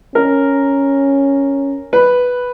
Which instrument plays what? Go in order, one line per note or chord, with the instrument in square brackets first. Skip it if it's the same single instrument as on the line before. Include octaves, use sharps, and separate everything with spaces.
[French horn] C#4 [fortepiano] A#4
[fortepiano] B4